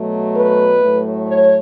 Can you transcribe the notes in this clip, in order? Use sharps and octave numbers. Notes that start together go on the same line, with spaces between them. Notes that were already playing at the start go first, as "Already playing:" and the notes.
Already playing: B2 F#3 A3
B4
A2 F#3 A3
C#5